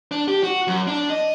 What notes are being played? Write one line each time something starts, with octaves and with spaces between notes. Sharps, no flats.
D4
G4
F#4
F#2
D4
D#5